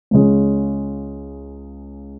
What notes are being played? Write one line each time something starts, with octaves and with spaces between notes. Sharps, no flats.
C#2 C#3 G#3 C#4